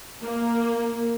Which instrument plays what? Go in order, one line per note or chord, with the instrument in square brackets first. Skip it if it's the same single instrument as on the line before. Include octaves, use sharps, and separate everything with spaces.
[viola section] A#3